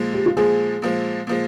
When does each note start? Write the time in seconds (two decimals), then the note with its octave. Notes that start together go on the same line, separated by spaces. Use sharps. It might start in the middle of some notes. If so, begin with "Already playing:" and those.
Already playing: A#2 F3 G#3
0.14 G4
0.26 F4
0.37 A#2 F3 G#3 G#4
0.82 A#2 F3 G#3
1.27 A#2 F3 G#3